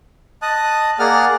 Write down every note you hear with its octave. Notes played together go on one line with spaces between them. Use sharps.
D#5 A5 D#6 F#6
A#3 G#4 D5 F#5 F6